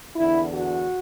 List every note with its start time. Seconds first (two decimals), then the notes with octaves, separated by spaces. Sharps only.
0.14 E2 D3 E4
0.51 F#4